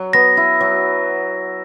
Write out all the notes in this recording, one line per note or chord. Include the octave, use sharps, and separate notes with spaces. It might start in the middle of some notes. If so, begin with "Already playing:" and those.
Already playing: F#3
B3 A#6
E4
F#3